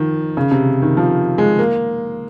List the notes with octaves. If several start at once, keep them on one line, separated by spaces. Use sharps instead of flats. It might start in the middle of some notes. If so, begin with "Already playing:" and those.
Already playing: D#3 F3
C#3
C3
D#3
F3
G#3
A#3